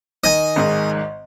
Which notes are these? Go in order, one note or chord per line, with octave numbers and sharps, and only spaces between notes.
D#3 D#5 G#5
G#1 G#2 D#3